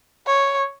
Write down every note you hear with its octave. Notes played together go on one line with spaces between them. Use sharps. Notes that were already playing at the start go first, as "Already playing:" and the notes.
C#5